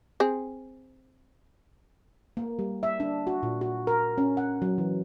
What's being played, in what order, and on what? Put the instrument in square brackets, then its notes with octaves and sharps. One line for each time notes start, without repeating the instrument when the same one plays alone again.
[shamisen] C4 G#4
[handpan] A#3
G3
E5
D4
F#4
A#2
F#4
A#4
C#4
F#5
F#3
E3